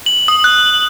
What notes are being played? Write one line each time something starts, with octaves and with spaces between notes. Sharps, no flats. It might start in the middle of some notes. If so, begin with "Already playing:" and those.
F#7
D#6
F#6